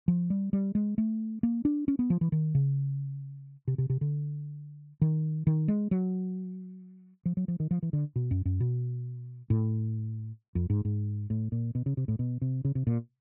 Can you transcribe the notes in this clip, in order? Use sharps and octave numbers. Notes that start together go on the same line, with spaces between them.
F3
G3
G3
G#3
A3
A#3
D4
C#4
B3
F3
E3
D#3
C#3
C3
C3
C3
D3
D#3
D#3
G#3
F#3
F3
F#3
F3
D#3
F3
E3
D3
B2
F#2
F#2
B2
A2
F2
G#2
G#2
A2
A#2
B2
C#3
C3
A2
B2
C3
C#3
C3
A#2